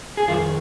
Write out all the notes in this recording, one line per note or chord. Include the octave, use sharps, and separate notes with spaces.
G#4
F2 D#3 F4